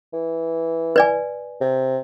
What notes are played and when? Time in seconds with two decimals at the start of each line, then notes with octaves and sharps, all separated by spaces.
0.13 E3
0.96 B4 D5 G#5
1.61 C3